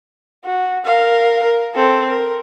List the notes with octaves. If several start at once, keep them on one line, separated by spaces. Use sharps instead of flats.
F#4
A#4 F5
A#4
C4 A4
A#4